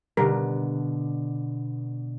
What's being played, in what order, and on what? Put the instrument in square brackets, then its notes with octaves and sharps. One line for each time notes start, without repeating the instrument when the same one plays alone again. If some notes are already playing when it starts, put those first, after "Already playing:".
[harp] B2 D3 [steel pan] G3 A#4